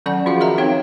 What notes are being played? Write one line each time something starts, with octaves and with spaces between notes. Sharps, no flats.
D#3 F#3 C#4 D5 F#5 A5
F3 F4 F#4 G#4 F5 F#5
F#4 A#4 D#5 E5 A#5
C4 D#4 G4 C#5 F5 G5